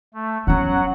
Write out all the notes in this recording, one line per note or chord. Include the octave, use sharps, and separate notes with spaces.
A3
E2 F#3 C#4 F#5